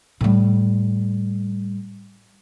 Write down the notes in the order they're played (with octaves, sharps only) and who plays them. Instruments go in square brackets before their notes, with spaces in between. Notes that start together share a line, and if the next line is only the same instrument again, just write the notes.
[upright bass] A2 G3